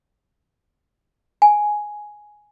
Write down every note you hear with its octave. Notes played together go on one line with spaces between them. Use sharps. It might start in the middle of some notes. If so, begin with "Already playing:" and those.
G#5